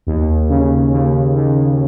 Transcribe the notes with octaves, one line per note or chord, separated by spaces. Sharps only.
D#2
C#3
D#2
D#2